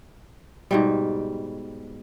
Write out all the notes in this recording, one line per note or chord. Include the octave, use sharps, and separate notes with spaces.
G#2 B2 G3